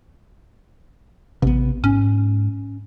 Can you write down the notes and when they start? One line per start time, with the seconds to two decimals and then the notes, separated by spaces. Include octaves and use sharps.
1.42 A1 C3 B3
1.84 G#2 C#4